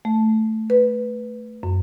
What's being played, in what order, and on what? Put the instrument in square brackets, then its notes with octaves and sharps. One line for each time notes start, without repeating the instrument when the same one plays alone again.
[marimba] A3
B4
F#2